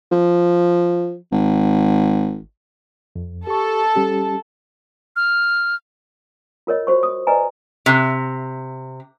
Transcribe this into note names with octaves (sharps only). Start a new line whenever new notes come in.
F3
G#1
F2
G4 A4 C#6
G3 C#4 G4
F6
F4 A#4 C#5 D#5
F#4 C5 C#6
D#6
B4 D5 D#5 G#5 A#5
C3